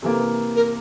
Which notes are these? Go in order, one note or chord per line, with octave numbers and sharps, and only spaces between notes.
C3 E3 A#3 A4
A#4